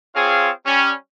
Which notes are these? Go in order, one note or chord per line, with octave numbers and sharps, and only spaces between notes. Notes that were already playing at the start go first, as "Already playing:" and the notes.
C4 F4 G#4 C#5 F5
G3 C#4